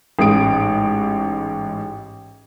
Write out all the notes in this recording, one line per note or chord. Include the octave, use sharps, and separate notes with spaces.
A1 G#2 D#6 D7